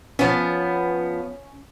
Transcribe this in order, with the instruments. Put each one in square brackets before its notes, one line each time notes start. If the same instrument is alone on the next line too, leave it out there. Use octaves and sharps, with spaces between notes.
[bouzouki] F3 B3 [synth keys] C#4